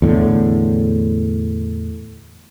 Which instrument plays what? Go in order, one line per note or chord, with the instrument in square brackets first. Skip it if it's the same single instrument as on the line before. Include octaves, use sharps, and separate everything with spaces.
[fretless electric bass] E2 A2 D3